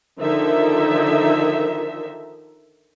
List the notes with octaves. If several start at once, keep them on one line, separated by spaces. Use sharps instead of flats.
D3 D#3 F3 D#4 E5